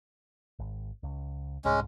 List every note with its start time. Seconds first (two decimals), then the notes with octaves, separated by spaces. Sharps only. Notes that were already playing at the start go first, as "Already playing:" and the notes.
0.59 G#1
1.03 C#2
1.65 C2 G#2 G#3 C#4